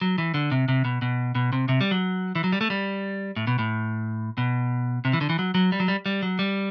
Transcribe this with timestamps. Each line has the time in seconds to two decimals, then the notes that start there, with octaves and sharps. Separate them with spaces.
0.01 F#3
0.18 E3
0.34 D3
0.51 C3
0.68 C3
0.85 B2
1.02 B2
1.35 B2
1.53 C3
1.69 C3
1.81 G3
1.91 F#3
2.35 E3
2.44 F#3
2.52 G3
2.61 A3
2.70 G3
3.36 A2
3.47 B2
3.59 A2
4.38 B2
5.05 C3
5.13 E3
5.21 D3
5.29 E3
5.39 F#3
5.55 F#3
5.72 G3
5.80 F#3
5.88 G3
6.06 G3
6.23 F#3
6.39 G3